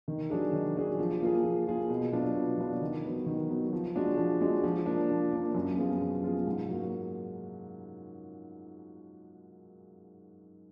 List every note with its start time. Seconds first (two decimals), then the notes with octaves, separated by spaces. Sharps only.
0.08 D#3
0.30 F#3 D4 G#4
0.53 D#3
0.76 F#3 D4 G#4
0.99 F3
1.21 A#3 F4 G#4
1.44 F3
1.67 A#3 F4 G#4
1.89 B2
2.12 F#3 B3 D4 F4
2.35 B2
2.58 F#3 B3 D4 F4
2.82 D#3
3.04 F#3 B3
3.26 D#3
3.49 F#3 B3
3.73 F3
3.96 G#3 D4 F#4
4.17 F3
4.41 G#3 D4 F#4
4.64 F3
4.86 A#3 D4
5.10 F3
5.31 A#3 D4
5.55 F#2
5.77 F3 B3 F4 G#4
6.01 F#2
6.23 F3 B3 F4 G#4
6.47 G#2
6.69 F#3 A#3